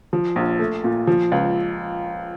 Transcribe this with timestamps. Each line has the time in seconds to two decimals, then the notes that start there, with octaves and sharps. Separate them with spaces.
0.13 F3
0.36 A#1
0.59 A3
0.84 A#2
1.07 F3
1.32 C#2